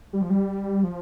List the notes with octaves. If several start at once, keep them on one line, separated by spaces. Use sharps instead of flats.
G3
F3
G3
F3